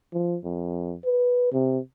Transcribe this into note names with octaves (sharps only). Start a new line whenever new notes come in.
F3
F2
B4
C3